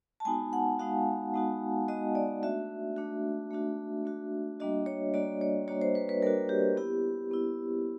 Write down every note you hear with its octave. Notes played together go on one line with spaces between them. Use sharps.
A5
G#3 B3 D#4 F#4 G#5
F#5
G#3 B3 D#4 F#4 F5
G#3 B3 D#4 F#4
G#3 B3 D#4 F#4 D#5
D5
A3 D4 F#4 E5
A3 D4 F#4
A3 D4 F#4
A3 D4 F#4
G3 A#3 D4 F#4 D#5
C#5
G3 A#3 D4 F#4 D5
C#5
G3 A#3 D4 F#4 C#5
C5
B4
B4
G3 A#3 D4 F#4 A#4
G4
B3 E4 G4
B3 E4